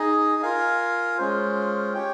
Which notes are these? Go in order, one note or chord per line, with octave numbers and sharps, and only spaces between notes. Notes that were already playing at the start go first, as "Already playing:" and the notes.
Already playing: D#4 G#4 D#5
F4 A#4 F5 G#5
G#3 C#4 F4 C5
G4 C#5 G5